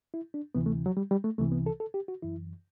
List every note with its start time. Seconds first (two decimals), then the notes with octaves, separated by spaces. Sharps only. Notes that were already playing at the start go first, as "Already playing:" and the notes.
0.14 E4
0.34 D4
0.55 D2 C3 E3 B3
0.66 A3
0.86 F#3
0.97 G3
1.11 G3
1.24 A3
1.38 C2 C3 E3 A3
1.52 B3
1.66 A4
1.80 A4
1.94 G4
2.08 F#4
2.22 F#2 E3 E4